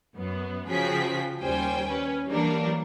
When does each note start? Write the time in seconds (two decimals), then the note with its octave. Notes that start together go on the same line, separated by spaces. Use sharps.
0.16 F#2 B3
0.68 C#3 F3 F#4 G#4 G5 B6
1.41 D#2 G3 C#4 C5 G5 G#5
1.88 C#4 B4
2.29 E3 F#3 G3 A#3 D4 A#4